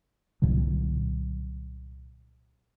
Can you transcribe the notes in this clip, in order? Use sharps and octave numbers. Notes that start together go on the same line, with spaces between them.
C2 A#2 D3 F#3